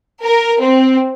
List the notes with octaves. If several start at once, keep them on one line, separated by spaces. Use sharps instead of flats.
A#4
C4